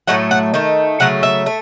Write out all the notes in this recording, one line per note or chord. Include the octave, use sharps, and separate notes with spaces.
A2 F#3 A3 F#5
F#5
D#3 A3
C#3 F#3 A3 F#5
E5
A3